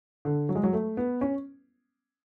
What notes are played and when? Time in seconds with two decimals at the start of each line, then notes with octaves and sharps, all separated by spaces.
0.25 D3
0.49 F#3
0.55 G#3
0.63 F#3
0.73 A3
0.97 B3
1.21 C#4